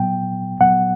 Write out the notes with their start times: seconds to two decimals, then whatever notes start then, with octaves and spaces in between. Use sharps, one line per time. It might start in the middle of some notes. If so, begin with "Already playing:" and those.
Already playing: A#2 F#3 B3 G5
0.60 A#2 F#3 B3 F#5